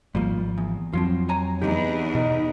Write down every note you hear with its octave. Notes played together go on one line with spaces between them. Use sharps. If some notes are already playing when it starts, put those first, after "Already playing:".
G#1 F3 G3 A#3
E2
F2 F3 F#3 C4 F4
C#5 G#5 A#5
E2 D#4 G4
B2 D#4